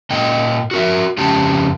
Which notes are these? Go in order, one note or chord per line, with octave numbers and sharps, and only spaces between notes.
A#2 D#5 G5
F#4 A#4 E5
F2 C#3 C#4 G4 A5